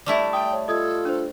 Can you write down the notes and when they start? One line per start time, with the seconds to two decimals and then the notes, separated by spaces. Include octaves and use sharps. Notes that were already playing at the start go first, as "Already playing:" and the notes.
0.06 G3 A3 E4 D5
0.33 G5 A5 D#6
0.52 C#5
0.68 F4 A4 D#5 D#6 G#6
1.05 D4 C5